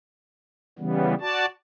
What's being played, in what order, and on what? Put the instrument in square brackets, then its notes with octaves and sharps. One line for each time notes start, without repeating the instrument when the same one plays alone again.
[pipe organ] C#3 E3 G3 B3
F#4 D5 A5